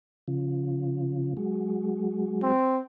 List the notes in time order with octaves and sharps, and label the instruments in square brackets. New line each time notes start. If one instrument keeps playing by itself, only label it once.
[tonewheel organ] C#3 F3
F#3 G#3
[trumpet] C4